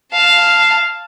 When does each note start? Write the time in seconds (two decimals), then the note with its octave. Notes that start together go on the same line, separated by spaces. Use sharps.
0.13 F5 A5